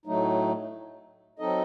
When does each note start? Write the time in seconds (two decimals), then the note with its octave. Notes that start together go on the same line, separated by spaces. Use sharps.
0.06 A2 F#3 A3 D#4
1.39 F#3 C4 D#4 A4 D#5